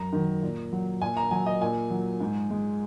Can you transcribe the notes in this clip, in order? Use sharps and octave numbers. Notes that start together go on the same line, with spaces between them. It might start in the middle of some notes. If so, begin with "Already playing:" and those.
Already playing: F#2 A#5
D#3 F#3
A#2
F#3
A#2 G#5
A#5
F#3 G#5
D#5
A#2 G#5
F#3
G#2
G#3